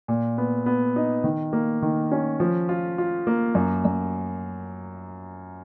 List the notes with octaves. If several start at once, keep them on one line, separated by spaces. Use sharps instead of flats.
A#2
B3
B3
D#4
D#3
A#3
D#3
C#4
F3
F4
F4
A#3
F#2
F#2